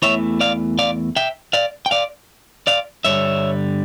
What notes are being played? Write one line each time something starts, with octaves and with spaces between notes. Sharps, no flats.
E2 E3 A3 C#5 E5
D5 F5
D5 F5
E5 G5
D5 F5
G5
D5 F5
D5 F5
G2 D3 G3 C#5 E5